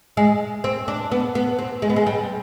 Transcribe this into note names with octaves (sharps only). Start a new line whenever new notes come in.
G#3
C4
D4
B3
B3
C4
G#3
B3
G#3
G3